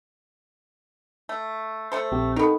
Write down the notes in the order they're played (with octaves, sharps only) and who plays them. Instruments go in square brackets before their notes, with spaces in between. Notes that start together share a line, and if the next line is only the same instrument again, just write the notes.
[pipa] A3
A3 A4 C5
[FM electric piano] A#1 C4 G4
[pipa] D#3 B3 [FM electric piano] D#4 A4